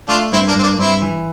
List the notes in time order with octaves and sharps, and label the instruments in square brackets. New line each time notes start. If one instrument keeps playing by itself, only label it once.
[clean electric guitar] A3 [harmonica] D4 F4
[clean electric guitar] G2 [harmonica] C4 E4
[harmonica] A#3 D4
[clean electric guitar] G2 [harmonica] C4
[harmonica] A#3 D4
[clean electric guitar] G2 [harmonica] C4 E4
[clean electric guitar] E3